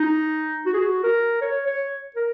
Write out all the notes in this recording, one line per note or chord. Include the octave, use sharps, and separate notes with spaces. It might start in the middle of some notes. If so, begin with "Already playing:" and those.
Already playing: D#4
F#4
G#4
F#4
A#4
C#5
C#5
A#4